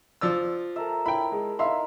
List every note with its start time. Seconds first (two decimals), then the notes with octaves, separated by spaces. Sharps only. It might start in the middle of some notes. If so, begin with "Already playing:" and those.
0.21 F3 D5 E6
0.76 A4 A#4 E5
1.06 E4 C#5 G5 B5
1.32 G#3
1.59 D#4 E4 E5 F5 C6